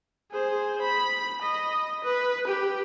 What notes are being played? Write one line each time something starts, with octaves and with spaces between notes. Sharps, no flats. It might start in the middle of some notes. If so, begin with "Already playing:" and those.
G#4 C5
B5
D#5
B4
G4